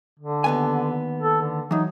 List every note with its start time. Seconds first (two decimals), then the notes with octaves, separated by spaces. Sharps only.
0.19 D3
0.44 D#2 B3 G#5
1.22 A4
1.42 D3
1.71 E3 F#3 D#4